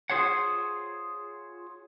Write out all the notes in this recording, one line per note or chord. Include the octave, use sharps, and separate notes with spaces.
F4 G#4 C5 C#5 F#5